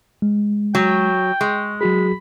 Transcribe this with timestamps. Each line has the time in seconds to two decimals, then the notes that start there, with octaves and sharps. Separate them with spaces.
0.22 G#3
0.75 F#3 G5
1.41 G#3 C#6
1.81 F#3 F#4 G#4 B5